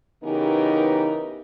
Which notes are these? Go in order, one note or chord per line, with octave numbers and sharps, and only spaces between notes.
C#3 E3 B3 D#4 G4 A#4